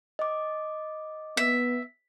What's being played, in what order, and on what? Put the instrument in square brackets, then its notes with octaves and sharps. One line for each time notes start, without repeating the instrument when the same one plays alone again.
[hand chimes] D#5 D6
[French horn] B3 [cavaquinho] E5